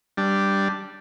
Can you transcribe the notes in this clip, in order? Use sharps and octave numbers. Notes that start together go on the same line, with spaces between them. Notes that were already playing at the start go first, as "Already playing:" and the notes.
G3 D4